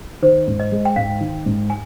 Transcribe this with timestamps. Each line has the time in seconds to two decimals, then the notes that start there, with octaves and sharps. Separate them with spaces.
0.22 D#3 C5
0.47 G#2
0.60 D#5
0.72 G#3
0.85 G5
0.96 G#2 F5
1.21 D#3
1.46 G#2
1.70 G#5